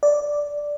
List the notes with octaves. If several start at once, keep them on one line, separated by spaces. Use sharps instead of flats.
D5